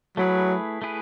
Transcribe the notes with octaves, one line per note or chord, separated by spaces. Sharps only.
F#3 A3 E4 G#4 B4
A3 E4 G#4 B4